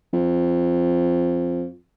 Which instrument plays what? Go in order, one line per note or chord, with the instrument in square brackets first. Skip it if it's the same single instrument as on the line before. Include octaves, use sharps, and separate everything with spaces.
[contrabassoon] F2